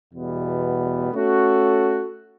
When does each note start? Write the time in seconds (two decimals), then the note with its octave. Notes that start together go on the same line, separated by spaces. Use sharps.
0.14 E2 B2 G3 B3
1.12 A3 C#4 F#4 A4